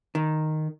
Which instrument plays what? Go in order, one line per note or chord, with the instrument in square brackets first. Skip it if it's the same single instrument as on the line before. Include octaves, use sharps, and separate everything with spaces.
[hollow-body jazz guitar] D#3